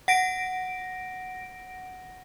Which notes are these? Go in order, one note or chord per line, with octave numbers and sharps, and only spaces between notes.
F#5 A#6 D7